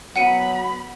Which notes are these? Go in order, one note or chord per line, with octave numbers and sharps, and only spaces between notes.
F#3 B3 F#5 B5 C#7 D#7